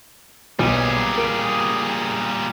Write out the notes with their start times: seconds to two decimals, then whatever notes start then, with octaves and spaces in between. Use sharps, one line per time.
0.59 B1 A#2 G3 G#4
1.17 A#4 D7